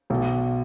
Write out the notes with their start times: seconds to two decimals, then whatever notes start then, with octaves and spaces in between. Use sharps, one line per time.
0.10 B1